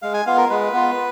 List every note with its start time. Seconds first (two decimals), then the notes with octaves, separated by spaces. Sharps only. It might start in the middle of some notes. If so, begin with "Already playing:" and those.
0.02 G#3 F5
0.14 G#5
0.26 B3 F4 F5
0.37 A#4
0.50 G#3 B4
0.73 B3 F4